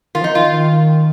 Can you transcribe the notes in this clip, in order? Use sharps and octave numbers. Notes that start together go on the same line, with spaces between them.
D#3 F4
F3
D#4
D#3
F4